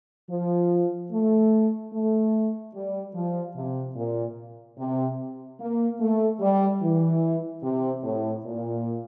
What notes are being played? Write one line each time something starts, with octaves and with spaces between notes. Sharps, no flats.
F3
A3
A3
G3
F3
C3
A#2
C3
A#3
A3
G3
E3
C3
A2
A#2